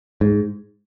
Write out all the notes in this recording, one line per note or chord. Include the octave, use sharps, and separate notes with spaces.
G#2